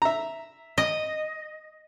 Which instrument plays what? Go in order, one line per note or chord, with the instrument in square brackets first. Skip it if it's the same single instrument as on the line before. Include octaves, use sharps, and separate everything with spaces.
[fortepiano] E5 A#5
[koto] D#5